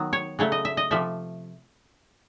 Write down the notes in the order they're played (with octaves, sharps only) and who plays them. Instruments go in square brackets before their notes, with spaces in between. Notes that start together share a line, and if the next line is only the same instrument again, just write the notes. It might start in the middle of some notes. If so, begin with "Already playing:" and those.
Already playing: [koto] D#3 F#3 B3
C#5
C#3 F#3 A3 C#5
D#5
E5
D#5
C3 F3 A3 E5